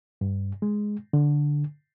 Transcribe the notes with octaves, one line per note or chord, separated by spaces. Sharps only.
G2
G#3
D3